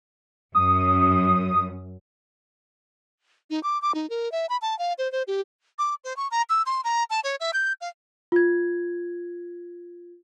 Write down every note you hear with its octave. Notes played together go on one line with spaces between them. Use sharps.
F#2 D#6
D#4
D6
D6
D#4
A#4
E5
B5
A5
F5
C5
C5
G4
D6
C5
C#6
A#5
E6
C6
A#5
A5
C#5
E5
G6
F5
F4 G#6